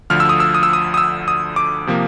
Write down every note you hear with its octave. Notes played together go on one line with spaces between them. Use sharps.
D2 D3 F3 F6
E6
D#6
E6
D#6
E6
D#6
D#6
E6
D#6
D6
C3 F3 A#3